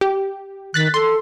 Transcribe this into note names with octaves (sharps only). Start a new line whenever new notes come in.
G4
D#3 F#6 A6 B6
A4 C6